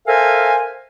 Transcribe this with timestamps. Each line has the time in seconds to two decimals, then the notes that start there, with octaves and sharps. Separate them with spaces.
0.08 A4 A#4 C5 E5 F5 G#5